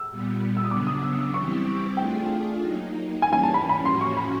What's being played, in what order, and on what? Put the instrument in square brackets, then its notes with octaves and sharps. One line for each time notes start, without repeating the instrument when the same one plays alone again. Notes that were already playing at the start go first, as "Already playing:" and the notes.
Already playing: [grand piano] E6
[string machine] A#2 G3 B3
[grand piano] E6
D#6
[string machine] C#3 F#3 B3 D4 [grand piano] D6
[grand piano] D#6
E6
E6
[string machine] E3 G3 C4 E4 G4 [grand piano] C#6
[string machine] A3 D4 F4 G#4 [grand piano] G5
[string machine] F#3 A#3 D#4
[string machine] E3 G3 A#3 C#4 [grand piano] G#5
[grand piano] G#5
A5
B5
B5
[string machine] A2 F3 A#3 C#4 F#4 [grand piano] C6
[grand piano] C#6
B5